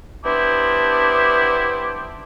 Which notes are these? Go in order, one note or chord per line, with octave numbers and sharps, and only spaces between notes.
B3 D4 E4 G4 C5